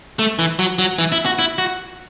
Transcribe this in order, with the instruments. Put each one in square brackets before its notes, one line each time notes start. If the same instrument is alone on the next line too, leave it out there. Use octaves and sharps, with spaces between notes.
[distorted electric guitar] A3
E3
F#3
F#3
E3
E4
F#4
E4
F#4